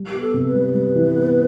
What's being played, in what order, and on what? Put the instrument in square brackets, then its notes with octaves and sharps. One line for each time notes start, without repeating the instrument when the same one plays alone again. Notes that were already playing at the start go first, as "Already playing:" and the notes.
Already playing: [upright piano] G3
[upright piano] B3 [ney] G4
[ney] A4
[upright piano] C3
[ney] B4
[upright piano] G3
G3
E3
B3